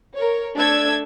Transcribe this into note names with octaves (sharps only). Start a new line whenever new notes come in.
A#4 C#5
A3 D4 A4 D5 E6 G#6